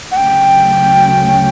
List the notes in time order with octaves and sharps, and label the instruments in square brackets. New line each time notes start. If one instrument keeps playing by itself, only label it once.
[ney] F#5
[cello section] D2 C#3 F#3 A3 C#4 [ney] G5